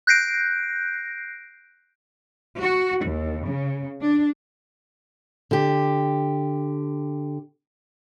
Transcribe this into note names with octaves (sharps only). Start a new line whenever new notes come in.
F#6 G6 A#6 C7 D7
F#4
D#2
C#3
D4
D3 G4